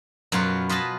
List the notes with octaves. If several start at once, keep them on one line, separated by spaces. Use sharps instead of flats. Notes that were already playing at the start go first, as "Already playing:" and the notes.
F#2 B2 F4 B4
F4 B4 D#5 G#5 A5 B5